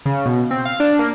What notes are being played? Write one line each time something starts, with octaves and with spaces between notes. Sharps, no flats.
C#3
B2
C4
F5
D4
A#3